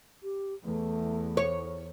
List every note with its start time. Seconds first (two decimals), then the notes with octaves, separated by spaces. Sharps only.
0.23 G4
0.65 E2 A3
1.37 C#5